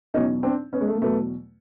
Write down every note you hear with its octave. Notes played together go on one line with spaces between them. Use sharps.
E2 B2 F#3 C#4 D#4
C4 D4
B3 C#4
G#3
A3
A#3
E2 B2 F#3 A3 B3